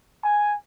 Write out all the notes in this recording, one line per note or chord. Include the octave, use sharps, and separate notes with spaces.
G#5